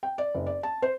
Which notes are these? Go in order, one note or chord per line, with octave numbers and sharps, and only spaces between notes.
G5
D5
F#1
D5
A5
C5